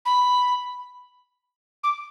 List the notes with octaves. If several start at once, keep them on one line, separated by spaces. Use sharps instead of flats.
B5
D6